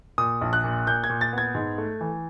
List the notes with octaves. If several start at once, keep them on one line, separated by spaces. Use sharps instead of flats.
A#2 D#6
A#1
F#6
A#2
A#2 G6
G#6
A#2
A6
B3 G#6
G#2
A3
E3